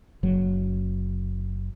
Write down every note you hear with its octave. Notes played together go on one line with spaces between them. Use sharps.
F#1 F#3